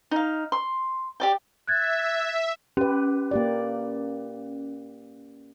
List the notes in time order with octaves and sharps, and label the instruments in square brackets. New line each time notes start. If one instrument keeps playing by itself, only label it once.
[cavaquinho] D#4 F5
C6
G4 D5 G5
[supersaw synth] E5 [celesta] F#6 G#6 A6
[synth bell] C#4 [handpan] G4 B4
[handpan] A#3 G4 D5